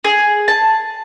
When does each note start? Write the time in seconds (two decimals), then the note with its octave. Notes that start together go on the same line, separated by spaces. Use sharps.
0.04 G#4
0.48 A5